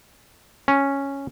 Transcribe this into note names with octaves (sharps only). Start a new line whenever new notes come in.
C#4